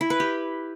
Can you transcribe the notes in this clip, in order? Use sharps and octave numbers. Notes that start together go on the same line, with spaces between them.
E4
B4
G4